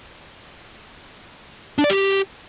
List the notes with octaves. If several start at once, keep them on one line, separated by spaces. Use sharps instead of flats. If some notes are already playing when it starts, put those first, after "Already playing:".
D4
D5
G4